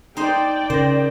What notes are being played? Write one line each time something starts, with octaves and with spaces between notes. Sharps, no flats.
D#4 C5 D5 G5
C#3 A#4 C5 A#6